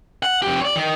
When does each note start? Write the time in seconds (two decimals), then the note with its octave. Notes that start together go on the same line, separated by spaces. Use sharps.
0.23 F#5
0.42 F2 G4
0.61 C#5 D5
0.76 D#3